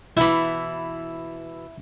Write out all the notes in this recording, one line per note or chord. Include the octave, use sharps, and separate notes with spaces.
B2 E3 E4 B5